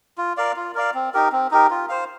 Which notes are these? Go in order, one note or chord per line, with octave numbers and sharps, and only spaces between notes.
F4
A#4 D5 F5
F4
A#4 D5 F5
C4
D#4 G4 A#4
C4
D#4 G4 A#4
F4
C5 F5